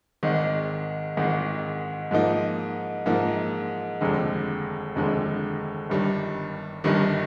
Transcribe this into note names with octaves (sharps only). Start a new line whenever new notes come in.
G#1 G#2 D#3
G#1 G#2 D#3
G#2 F3 A#3 D#4
G#2 F3 A#3 D#4
F1 D#2 D3 G#3
F1 D#2 D3 G#3
G1 G2 D#3 G3
G1 G2 D#3 G3